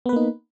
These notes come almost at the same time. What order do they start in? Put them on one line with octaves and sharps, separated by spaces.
B3 B4 A#3 D#4